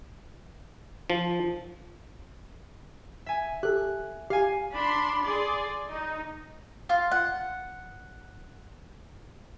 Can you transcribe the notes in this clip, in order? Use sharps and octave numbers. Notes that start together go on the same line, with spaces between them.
F3
E5 G#5
G4 A4 F#6
G4 F5 G#5
D4 B5 C6
G#4 D5 C6
D#4
F4
F#5